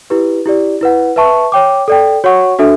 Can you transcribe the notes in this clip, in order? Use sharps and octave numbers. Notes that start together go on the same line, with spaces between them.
E4 G4 B4
E4 G4 D5
E4 B4 F#5
B4 E5 A5 C#6
C#5 G5 D6
A4 D5 G5
F#4 C#5 F#5 C#6
D4 F#4 A4 E5